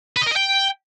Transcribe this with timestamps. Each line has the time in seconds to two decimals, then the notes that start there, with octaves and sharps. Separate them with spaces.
0.17 B4
0.22 D#5
0.27 A#4
0.32 D#5
0.37 G5